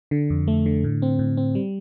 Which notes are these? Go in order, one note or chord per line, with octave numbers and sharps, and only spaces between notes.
D3
F2
A3
D3
A2
C4
A2
C4
G3